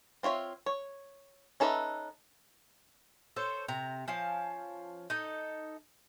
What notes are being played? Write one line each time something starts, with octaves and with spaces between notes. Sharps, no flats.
C4 F4 C#5 E5
C#5
C#4 D#4 A4 B4 E5
A4 C5 C#5
C3 A#5
F3 C#4 F5 A5
D#4 A4